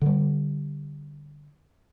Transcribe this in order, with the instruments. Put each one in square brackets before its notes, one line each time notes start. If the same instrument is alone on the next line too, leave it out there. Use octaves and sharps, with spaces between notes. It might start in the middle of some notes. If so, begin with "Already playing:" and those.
[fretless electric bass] D3 G3